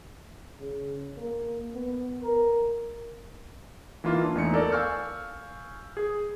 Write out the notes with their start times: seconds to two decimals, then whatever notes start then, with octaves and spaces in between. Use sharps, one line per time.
0.59 C#3
1.16 A#3
1.75 B3
2.22 A#4
4.04 E3 A#3 D#4 F4
4.23 D4
4.36 E2 A3 D#4 C#7
4.54 A4 A#4 D5
4.72 F5 G#5 C#6 E6 F6 G6
5.97 G#4